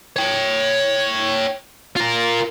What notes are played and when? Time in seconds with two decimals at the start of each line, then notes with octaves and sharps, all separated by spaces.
0.16 C#5 G5
1.96 F4 A#4